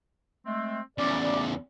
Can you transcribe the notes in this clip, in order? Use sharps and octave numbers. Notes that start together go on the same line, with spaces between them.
G#3 A3 C4
E2 C#3 D5